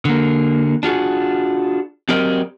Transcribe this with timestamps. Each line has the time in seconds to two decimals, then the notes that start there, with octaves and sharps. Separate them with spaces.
0.05 D3 A#3
0.83 D4 F4 F#4 G#4
2.09 F#3 C4 G4 A#4 D5 D#5